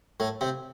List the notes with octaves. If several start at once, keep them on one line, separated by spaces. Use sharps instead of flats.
A2 A3
C3 C4